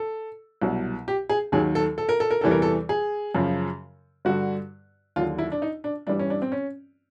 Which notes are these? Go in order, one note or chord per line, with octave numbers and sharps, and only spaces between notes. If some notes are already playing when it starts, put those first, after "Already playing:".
Already playing: A4
C2 B2 F#3
G4
G#4
D#2 D#3 F#3 G#4
A4
A4
A#4
A4
A#4
E2 C3 E3 G3 A4
A#4
A4
G#4
F#2 C#3 F3
G2 D3 G3 F#4
D#2 D3 F#3 F4
E4
D4
D#4
D4
G2 E3 G3 D4
C#4
D4
C4
C#4